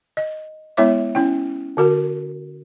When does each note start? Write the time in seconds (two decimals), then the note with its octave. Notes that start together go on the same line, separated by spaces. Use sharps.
0.17 D#5
0.77 G#3 B3 E4 C#5 E5 D6
1.15 C#4 E4 G5
1.77 D3 F#4 A#4